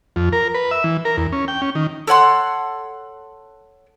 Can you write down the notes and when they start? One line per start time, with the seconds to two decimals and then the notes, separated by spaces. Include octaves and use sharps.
0.16 F2
0.33 A#4
0.55 B4
0.71 E5
0.84 E3
1.05 A#4
1.17 E2
1.33 C#4
1.48 G5
1.62 C#4
1.75 D#3
2.07 A4 C#5 F#5 C6